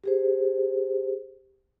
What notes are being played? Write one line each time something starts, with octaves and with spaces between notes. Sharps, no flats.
G4 G#4 C5